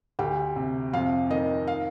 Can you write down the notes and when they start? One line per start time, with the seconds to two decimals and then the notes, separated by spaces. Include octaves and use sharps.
0.19 D2 G4
0.56 C3
0.93 F2 F5
1.30 D#3 D#5
1.67 F5